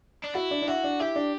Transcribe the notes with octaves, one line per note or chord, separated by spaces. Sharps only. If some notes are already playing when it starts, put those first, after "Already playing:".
D4
E4 F#4
D4
D4
E4 F#4
D4
E4 G4
D4